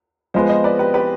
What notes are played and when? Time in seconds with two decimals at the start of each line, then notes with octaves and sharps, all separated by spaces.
0.34 F3 G#3 B3 C5 D#5
0.49 C5 D#5
0.64 B4 D5
0.79 G4 B4
0.94 G4 B4